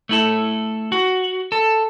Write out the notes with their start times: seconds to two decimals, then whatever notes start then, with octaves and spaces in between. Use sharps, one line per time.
0.09 A3 E4 A4
0.92 F#4
1.52 A4